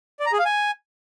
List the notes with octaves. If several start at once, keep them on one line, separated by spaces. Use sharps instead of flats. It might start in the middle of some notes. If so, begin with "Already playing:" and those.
D5
A#5
G#4
F5
G#5